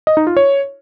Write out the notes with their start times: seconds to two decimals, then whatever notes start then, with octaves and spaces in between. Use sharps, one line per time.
0.07 D#5
0.17 D#4
0.27 F4
0.37 C#5